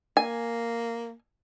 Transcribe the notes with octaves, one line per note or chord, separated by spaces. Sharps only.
A#3 G#5